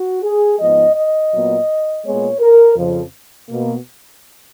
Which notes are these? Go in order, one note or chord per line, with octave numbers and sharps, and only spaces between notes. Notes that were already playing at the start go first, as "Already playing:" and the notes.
Already playing: F#4
G#4
G#2 F3 G#3 B3 D#5
D#5
A#2 F#3 B3
A#2 G#3 B3 C#5
A#4
F2 C#3 F3
B2 A#3